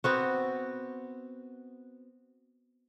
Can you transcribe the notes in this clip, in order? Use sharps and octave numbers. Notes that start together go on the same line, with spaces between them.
B3 C4 F#4